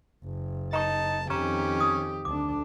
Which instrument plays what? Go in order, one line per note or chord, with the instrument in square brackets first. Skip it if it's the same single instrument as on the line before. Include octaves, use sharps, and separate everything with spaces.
[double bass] F#1
[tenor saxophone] D#4 [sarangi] A5 [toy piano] A#5 C#6
[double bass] F2 D#3 [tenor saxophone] C#4 [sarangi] G4 [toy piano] A#5
[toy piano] D#6
[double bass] D2 D4 [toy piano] D6